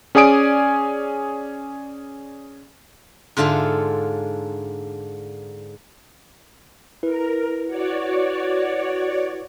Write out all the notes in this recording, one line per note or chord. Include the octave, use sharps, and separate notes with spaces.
C#4 G#4 D5 G#5 D#6 D7
G#2 D3 F4 A4 E5
E4 A#4 B4
F#4 C#5 D5